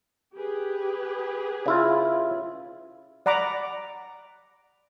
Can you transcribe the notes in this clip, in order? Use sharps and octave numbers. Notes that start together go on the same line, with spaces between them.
G4 G#4 B4
C#3 E4 F4
D5 F#5 A#5 B5 D6